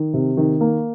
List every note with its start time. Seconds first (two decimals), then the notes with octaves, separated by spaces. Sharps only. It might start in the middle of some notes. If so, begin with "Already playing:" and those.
Already playing: D#3
0.14 C3
0.37 D#3
0.61 A#3